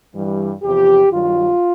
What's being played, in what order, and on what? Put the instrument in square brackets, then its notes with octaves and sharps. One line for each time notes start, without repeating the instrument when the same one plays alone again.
[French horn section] G2 E3 G3
E2 C3 F3 G4
G2 D#3 F#3 F4